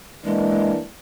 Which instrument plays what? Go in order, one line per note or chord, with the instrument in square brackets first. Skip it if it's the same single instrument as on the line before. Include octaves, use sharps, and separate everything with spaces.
[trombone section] E3 A#3 D4 [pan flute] G#3